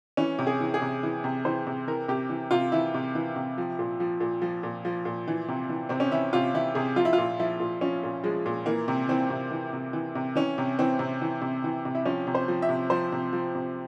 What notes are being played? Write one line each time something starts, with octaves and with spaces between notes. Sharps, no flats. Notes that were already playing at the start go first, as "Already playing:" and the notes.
E3 C#4
C3
G#4
E3
G#4
C3
E3
C3
E3 C5
C3
E3 A#4
C3 G4
E3
C3 F4
E3 E4
C3
E3
C3
F3
A#2
F3
A#2
F3
A#2
F3
A#2
E3
C3
E3
C3 C4
C#4
E3 E4
C3 F4
E3 E4
C3 G#4
F3 F4
E4
A#2 F4
F3 E4
A#2
F3 C#4
A#2
F3 G#3
A#2
E3 A#3
C3
E3 C4
C3
E3
C3
E3
C3
E3 C#4
C3
E3 C4
C3
E3
C3
E3
C3
E4
F3 C#4
C3
C5
F3
E5
C3
F3 C5
C3
F3
C3